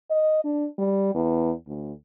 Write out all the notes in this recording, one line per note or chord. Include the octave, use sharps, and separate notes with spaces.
D#5
D4
G3
E2
D2